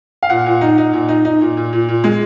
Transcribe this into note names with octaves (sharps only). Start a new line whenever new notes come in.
F5
A#2 F#5
A#2
D#4
D#4
A#2
D#4
D#4
A#2
A#2
A#2
A#2
G#3